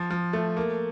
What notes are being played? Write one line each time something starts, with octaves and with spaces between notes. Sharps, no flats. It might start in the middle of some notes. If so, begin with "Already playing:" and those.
Already playing: F3
F3
A3
A#3